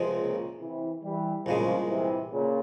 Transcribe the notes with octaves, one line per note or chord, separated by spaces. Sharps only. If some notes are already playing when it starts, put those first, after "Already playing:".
Already playing: C#2 C3 F3 G#3 C4
A#2 C#3
C3 E3
E3 G3
C2 A#2 C#3 F3 G#3
C3 E3
A#2 C#3